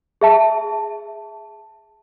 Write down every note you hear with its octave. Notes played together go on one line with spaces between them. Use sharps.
G#4 E5 A5